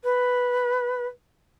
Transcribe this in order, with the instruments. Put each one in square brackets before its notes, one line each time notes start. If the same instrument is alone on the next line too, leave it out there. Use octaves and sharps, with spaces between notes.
[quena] B4